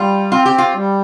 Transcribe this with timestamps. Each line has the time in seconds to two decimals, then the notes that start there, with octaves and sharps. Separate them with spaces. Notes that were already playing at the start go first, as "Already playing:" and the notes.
Already playing: G3 F4
0.32 C4 F4
0.46 G4
0.58 F4
0.75 G3